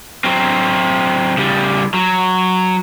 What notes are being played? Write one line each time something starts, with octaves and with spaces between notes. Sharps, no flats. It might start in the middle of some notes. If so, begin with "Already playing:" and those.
F#3 C4
C#3 G3
F#3